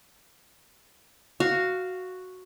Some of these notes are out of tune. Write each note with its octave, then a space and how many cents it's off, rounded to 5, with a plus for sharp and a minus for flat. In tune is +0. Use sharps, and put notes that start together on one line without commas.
F#4 +0 F5 +0